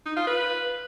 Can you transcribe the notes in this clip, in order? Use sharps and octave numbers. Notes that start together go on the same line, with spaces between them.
D#4
F4
B4